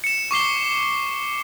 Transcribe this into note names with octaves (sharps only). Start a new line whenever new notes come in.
C#7 E7
C#6 D6 C7 G7